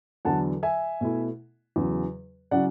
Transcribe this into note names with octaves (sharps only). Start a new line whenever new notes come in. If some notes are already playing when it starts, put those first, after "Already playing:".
E2 D3 F#3 F#5 A5
E5 G#5
B2 A3 E4
E2 C#3 F#3
C#3 F#3 C#4 E4 D5 F#5